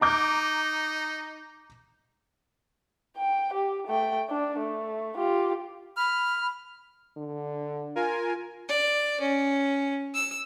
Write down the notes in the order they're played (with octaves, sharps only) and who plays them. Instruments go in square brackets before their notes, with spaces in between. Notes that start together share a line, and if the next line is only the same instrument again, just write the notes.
[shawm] D#4 [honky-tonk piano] A#5 D6 G6
[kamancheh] G5
G4
A3 G5
D4
A3
F4 G4
[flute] B5 [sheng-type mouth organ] F6
[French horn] D3
[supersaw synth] F4 A#4 G#5
[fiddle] D5
C#4
E6